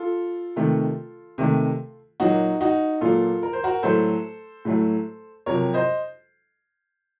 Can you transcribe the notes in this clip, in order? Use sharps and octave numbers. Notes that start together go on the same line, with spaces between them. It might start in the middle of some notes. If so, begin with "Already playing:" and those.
Already playing: F4 A4
C3 D#3 A3
C3 D#3 A3
A#2 F#3 A#3 D#4 F#4
D#4 F#4
A#2 F#3 A#3 F4 A4
A#4
C5
F#4 A#4
A2 F#3 A3 A4 C5
A2 F#3 A3
F2 C3 F#3 A#4 C#5
C5 D#5